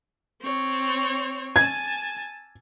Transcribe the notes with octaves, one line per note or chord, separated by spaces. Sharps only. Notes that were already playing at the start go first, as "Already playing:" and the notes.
C4 C#5
G#5 A5 G#6